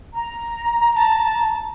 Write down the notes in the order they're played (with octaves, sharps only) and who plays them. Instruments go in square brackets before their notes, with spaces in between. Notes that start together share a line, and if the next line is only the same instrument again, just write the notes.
[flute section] A#5
[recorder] A5